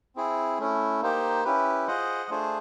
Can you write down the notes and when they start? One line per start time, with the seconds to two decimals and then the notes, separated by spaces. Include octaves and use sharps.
0.16 C4 E4 G#4
0.59 A3 C#4 E4
1.02 A#3 D#4 G4 C5
1.45 C#4 E4 G4 B4
1.87 F4 G#4 C5 D#5 F#5
2.30 A3 D4 F4 G#4 C5